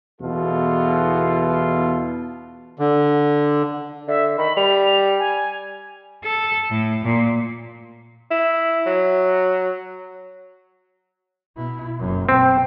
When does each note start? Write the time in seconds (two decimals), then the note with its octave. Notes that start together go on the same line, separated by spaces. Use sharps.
0.21 E2 B2 E4 F4 A4
2.79 D3
4.08 D3 E5
4.38 D#3 B5
4.57 G3 F7
5.19 G#5
6.24 A4
6.71 A2
7.04 A#2
8.31 E4
8.87 F#3
11.56 B2 E4
11.99 F#1 F#2
12.29 B2 C4 G5